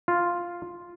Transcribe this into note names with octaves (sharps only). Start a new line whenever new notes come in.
F4